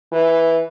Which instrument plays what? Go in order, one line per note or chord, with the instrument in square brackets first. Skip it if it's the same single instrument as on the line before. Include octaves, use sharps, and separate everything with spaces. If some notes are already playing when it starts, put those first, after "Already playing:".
[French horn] E3